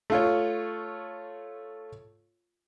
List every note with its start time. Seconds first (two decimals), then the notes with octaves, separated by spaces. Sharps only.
0.10 A3 F4 C#5